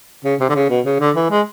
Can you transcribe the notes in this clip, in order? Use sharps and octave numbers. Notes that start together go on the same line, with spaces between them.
C#3
C3
D3
C#3
B2
C#3
D3
E3
G#3